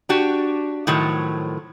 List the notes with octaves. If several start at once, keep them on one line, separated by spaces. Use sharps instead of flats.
D4 F#4 G4
A2 D#3 F3 F#3